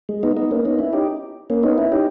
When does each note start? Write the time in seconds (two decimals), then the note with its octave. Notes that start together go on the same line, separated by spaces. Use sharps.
0.09 G#3
0.23 B3 D#4
0.37 B3 D#4
0.51 A#3 C#4
0.65 B3 D#4
0.79 C#4 E4
0.93 D#4 G4
1.50 A#3 C#4
1.63 B3 D#4
1.78 C#4 E4
1.92 D#4 G4